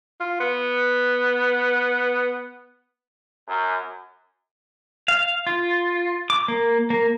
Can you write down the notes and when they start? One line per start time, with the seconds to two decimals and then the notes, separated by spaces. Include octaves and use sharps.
0.20 F4
0.40 B3
3.47 F#2
5.08 F5
5.47 F4
6.30 D6
6.48 A#3
6.90 A#3